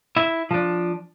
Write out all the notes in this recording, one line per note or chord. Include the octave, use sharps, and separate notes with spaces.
E4 E5
F3 D4